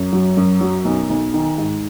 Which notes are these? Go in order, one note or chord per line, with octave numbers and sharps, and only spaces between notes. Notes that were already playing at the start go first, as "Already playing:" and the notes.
Already playing: F#2
F#3
F#2
F#3
B1
B1
D#3
G#2